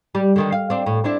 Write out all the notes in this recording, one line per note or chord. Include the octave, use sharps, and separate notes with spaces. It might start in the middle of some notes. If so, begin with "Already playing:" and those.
G3
D3 D#3 G3
F5
C4 D4
A2
C4 D4 E4